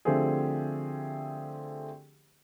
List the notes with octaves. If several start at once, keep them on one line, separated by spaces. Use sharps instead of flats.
D3 F3 A3 C4 G4 G#4